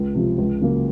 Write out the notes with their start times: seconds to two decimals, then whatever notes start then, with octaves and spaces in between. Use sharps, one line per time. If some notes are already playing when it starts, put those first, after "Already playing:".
Already playing: C#2
0.15 C3 F3
0.38 C#2
0.61 C#3 F#3 A#3